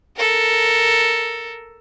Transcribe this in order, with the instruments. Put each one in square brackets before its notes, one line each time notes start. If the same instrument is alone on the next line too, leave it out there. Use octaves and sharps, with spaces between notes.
[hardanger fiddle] A4 A#4